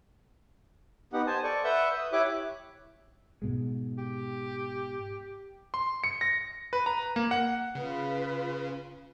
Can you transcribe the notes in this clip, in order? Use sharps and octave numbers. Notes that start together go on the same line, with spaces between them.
B3 D#4 G4 F#5
C5 G#5 A5
A4 D5 C#6
B4 E5 F#5 C#6 E6 G6
D#6
E4 G4 C#5 E5 D6 F#6
G#2 B2 G#3
G4
C6
C#7
A#6
B4
A#5
A#3
F#5
C#3 F4 B4